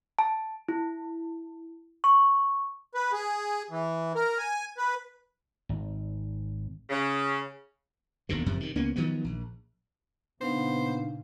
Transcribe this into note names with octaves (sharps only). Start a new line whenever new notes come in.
A5
E4
C#6
B4
G#4
E3
A#4
G#5
B4
G#1
C#3
E1 D#2 B2 D3
F#1 F#2 C3 F3
C3 D#3
C#2 A#3 B3 C#4
D#3 F3 F#3 B3
A#1
A#2 C#3 B3 D4 D#4 C5 F5